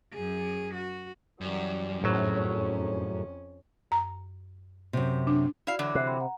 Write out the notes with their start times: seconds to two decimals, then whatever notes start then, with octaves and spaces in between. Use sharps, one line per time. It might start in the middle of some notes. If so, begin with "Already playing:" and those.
0.13 F#2 G#4
0.74 F#4
1.41 F#2 E3 G3
2.04 G#1 F2 A2 F#3 C#4
3.91 F#2 A#5
4.93 F#2 C3
5.27 D4
5.67 E4 F#4 D5 F5
5.79 D3 E3 F#3
5.95 C3 F#6 C7
6.07 G5 B5 C6
6.20 F#5 A#5